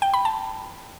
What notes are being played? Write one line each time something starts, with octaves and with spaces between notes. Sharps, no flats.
G5
B5
A5